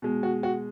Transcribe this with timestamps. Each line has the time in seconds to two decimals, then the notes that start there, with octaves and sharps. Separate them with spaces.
0.02 B2 G#3
0.23 F#4
0.43 F#4